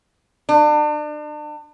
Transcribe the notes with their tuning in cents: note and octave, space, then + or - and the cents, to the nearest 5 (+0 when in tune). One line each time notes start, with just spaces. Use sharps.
D4 +35